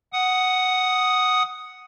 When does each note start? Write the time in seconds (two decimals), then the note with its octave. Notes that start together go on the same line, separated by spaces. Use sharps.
0.13 F#5 D#6